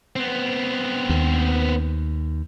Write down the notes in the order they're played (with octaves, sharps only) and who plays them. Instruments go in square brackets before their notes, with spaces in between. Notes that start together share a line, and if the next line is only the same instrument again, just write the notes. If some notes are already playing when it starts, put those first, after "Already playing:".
[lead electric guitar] B3 C4
[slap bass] D#2